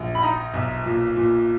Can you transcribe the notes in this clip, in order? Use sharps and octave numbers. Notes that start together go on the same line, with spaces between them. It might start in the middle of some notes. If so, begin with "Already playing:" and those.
Already playing: A#1
B5
D#4 A#5
B1
A#2
A#2